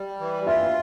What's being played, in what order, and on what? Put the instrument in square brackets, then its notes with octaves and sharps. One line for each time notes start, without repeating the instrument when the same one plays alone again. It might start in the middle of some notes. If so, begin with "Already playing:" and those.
Already playing: [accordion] G3
E3
[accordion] F4 [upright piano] E5